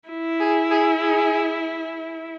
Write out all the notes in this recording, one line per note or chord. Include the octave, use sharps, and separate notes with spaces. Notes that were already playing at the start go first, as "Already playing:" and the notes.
E4
G#4
G#4
G#4